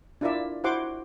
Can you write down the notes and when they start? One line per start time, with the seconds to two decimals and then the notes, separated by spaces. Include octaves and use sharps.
0.21 D4 E4 F4 A#4 D5 E5
0.64 E4 F#4 C5 F#5 C6 D6